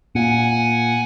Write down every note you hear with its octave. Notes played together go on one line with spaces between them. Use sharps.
A#2 F#5 G#5